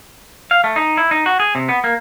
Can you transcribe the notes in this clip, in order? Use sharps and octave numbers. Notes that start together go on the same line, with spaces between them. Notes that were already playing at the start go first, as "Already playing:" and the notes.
F5
A3
D#4
E4
D#4
F#4
G#4
C3
B3
A#3